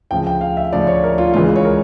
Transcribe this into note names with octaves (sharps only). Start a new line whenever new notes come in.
D2 C#3 F3 G5
G5
F5
E5
D2 C#3 F3 D5
C#5
A#4
F4
C#2 C#3 E3 F4
C#5
A#4